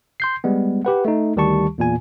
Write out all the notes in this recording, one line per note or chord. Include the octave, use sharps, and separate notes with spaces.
C6 G6 C7
G3 G#3 B3
G4 B4 F#5
A3 D#4
D2 D#3 G3 G4 A5 C#6
E2 A#2 G#5